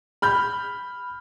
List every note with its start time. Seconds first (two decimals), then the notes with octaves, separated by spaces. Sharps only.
0.22 B5 F6 G6